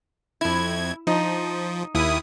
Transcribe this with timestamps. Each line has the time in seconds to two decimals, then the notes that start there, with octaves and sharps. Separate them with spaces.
0.41 F2 E4 G#6
1.07 F3 D#4
1.95 D#2 E4 D#6